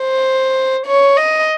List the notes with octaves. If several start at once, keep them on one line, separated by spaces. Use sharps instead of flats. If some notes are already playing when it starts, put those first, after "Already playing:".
Already playing: C5
C#5
D#5